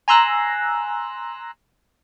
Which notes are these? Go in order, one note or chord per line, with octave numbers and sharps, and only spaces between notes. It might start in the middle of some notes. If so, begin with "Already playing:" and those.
G#5 A#5 C6 E6 F#6 A#6